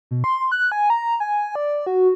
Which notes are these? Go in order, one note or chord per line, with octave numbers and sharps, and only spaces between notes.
B2
C6
F#6
G#5
A#5
G#5
D5
F#4